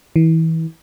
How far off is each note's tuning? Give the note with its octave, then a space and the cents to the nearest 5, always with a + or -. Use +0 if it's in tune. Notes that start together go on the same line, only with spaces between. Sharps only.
E3 -30